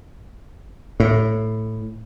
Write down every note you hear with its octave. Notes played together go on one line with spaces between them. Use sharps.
A2